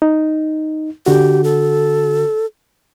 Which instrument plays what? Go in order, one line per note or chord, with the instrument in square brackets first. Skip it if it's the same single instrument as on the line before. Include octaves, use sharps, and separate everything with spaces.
[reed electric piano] D#4
[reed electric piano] D3 F#4 [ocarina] G4
[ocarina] A4